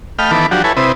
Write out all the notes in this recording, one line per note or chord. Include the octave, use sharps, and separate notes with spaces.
A3 D#5 F5 G5 B5 F6
D#3 E3 B3 A4 B5 D6
F3 F#3 D4 F#4 G4
E4 A4 B4 C#5 G#5
C3 C4 E4 B4 D#6